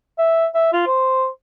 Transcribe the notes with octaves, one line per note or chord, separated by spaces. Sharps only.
E5
E5
F4
C5